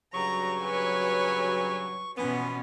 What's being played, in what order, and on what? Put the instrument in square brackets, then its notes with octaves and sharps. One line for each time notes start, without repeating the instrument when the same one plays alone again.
[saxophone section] G2 C#3 F#3 [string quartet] A#5 [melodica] C#6
[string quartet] B4 C#5 G#5
[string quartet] B2 C#4 [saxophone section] E3 F3 B3